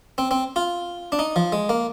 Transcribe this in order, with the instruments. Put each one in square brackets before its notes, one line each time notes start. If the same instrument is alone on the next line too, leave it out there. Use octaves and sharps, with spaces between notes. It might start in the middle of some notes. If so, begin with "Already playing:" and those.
[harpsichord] C4
C4
F4
D4
D#4
F3
G#3
A#3